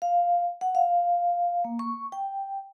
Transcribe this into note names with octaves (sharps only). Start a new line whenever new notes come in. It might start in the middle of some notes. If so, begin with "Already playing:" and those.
F5
F#5
F5
A#3
C#6
G5